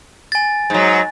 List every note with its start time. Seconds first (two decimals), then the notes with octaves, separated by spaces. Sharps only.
0.32 G#5 A6
0.70 G#2 F#3